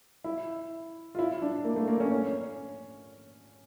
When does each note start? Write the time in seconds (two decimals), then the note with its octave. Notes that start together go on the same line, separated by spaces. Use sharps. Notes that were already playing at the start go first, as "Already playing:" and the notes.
0.24 E4
1.15 F4
1.19 E4
1.42 D4
1.64 A#3
1.76 A3
1.88 A#3
2.00 C#4
2.12 C#4